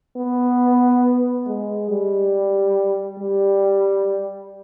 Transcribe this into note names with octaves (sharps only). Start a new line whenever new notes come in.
B3
G#3
G3
G3